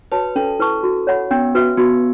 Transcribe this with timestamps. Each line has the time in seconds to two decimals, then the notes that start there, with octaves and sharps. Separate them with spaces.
0.12 F#4 B4 C#5 A5
0.36 C#4 A4
0.59 E4 B4 A5 C#6
0.83 F#4
1.07 C#5 F#5 B5
1.31 B3 C#4
1.55 F#4 B4 E5
1.78 B3 F#4